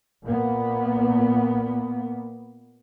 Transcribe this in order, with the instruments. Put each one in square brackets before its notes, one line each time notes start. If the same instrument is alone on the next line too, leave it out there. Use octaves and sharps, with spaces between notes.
[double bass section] A#2 A#3 B3